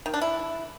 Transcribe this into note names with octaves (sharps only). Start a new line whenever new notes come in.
D#3
D4
E4